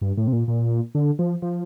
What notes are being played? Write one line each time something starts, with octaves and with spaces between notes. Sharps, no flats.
G2
A2
C3
A#2
A#2
D3
F3
F3